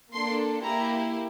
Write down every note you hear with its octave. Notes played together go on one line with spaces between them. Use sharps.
A#3 D4 A4 C6
A#3 E4 G4 A#5